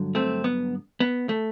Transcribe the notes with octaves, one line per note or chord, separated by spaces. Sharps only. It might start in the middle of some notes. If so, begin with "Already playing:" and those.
Already playing: G2 D3 F#3
A3 C4
B3
B3
A3